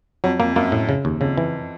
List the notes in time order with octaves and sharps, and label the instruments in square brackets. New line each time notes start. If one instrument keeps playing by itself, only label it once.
[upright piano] F2 [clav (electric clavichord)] F#3
[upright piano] F2 [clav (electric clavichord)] A#3
[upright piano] F#2 [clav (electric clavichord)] A#3
[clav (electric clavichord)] A2
C#3
D#2
[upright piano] F2 [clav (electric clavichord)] C#3
[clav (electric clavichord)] E3